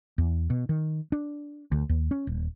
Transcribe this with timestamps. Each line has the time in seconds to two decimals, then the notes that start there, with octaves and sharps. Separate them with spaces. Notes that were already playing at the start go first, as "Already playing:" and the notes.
0.18 E2
0.50 B2
0.69 D#3
1.12 D4
1.72 D2
1.89 D#2
2.11 C#4
2.27 D#1